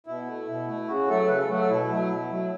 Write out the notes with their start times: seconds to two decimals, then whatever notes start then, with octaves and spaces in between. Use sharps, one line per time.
0.07 B2 E4
0.27 A3
0.48 B2
0.67 A3
0.88 C#3 F#4
1.08 F#3 A3 A4
1.28 C#3 B4
1.38 A4
1.49 F#3 A3 F#4
1.59 A4
1.69 B2 E4
1.89 F#3 A3
2.09 B2
2.29 F#3 A3